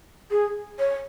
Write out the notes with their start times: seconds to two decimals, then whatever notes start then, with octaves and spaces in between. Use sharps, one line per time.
0.31 G#4
0.79 C#5